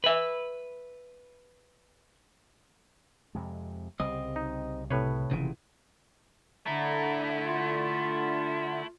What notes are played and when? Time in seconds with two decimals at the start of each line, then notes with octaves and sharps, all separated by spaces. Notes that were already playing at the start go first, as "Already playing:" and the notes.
0.04 B4 E5
3.35 F2 C3 G#3
4.00 C2 C#3 G3 C4 D#5
4.36 D#4
4.90 A2 C3 B4 C#5
5.31 F1 A#2 C#3 E3
6.66 D3 A3 E4 A#5
7.46 F4